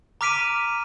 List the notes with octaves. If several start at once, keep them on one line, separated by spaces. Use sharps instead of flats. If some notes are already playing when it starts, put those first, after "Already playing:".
A#5 D6 F6 B6 D7 D#7